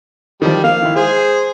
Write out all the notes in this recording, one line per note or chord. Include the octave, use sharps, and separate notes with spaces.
D#3 F3 G3
A#3 F5
D#3 E4
G#3 G#4 C5